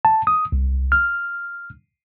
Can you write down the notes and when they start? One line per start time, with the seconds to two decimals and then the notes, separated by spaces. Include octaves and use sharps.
0.05 A5
0.27 D#6
0.52 C2
0.92 F6